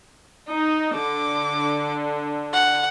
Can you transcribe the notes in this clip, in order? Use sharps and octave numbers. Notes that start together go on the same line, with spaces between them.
D#4
D3 D6
F#5